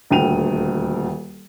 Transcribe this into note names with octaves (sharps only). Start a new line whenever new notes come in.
D#1 D2 G5 D#7 F7